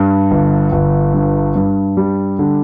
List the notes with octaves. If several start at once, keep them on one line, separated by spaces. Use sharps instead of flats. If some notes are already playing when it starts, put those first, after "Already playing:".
Already playing: G2
G1
G1
G2
G2
G3
D3